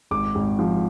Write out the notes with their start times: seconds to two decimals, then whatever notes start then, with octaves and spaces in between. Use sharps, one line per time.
0.11 G#1 D6
0.35 G#1
0.59 F3